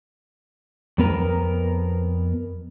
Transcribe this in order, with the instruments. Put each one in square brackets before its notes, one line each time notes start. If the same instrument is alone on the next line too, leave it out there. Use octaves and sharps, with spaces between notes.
[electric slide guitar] F2 B3 A#4